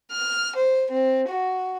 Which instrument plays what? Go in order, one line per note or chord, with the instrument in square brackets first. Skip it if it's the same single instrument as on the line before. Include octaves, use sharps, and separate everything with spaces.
[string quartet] F6
C5
C4
F#4